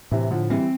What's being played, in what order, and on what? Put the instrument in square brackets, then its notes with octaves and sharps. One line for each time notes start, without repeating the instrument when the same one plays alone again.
[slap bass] A2 [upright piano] C3 E3
[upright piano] D3 F3
[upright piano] E3 G3 [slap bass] C4